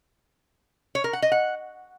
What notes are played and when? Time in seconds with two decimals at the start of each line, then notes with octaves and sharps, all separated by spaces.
0.95 C#5
1.04 A#4
1.13 F#5
1.22 D#5
1.32 F#5